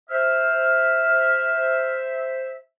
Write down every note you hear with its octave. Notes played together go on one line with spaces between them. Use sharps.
C5 E5 F6